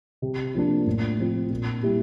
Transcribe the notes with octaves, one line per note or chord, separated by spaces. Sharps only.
C3
F3 A#3 D4
A2
F3 C4 F4
A#2
G3 A#3 E4 G4